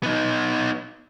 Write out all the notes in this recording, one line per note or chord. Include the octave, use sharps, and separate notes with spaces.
B3 D#4